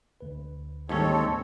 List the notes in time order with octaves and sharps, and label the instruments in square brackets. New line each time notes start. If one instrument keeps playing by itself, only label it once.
[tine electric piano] D2 B4
[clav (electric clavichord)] D#2 C#4 [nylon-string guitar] G#2 G3 G#3 [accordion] C4 A4 C#5